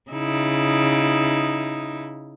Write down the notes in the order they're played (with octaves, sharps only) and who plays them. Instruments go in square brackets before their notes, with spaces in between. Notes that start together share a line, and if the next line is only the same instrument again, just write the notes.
[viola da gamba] C#3 D#4 E4